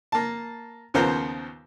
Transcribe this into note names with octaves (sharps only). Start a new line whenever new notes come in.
A#3 A5
D#2 C#3 F3 B3 A#4 C5